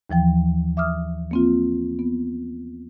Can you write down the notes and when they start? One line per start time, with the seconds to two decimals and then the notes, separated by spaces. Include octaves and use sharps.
0.10 D#2 E3 F3 G5
0.77 E5 D6 D#6 F6
1.31 A#3 C4 F4
1.99 B3